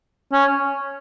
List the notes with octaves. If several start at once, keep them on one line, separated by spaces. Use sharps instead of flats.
C#4